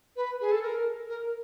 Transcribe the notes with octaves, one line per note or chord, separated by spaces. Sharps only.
B4
G#4
A4
A#4
A#4